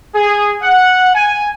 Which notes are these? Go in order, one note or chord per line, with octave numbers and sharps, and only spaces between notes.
G#4
F#5
G#5